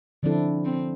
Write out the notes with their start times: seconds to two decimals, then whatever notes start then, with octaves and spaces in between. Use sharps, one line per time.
0.23 D3 F3 C4 D4 E4 A4
0.65 C4